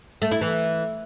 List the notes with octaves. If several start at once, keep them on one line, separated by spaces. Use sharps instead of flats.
A3
E4
E3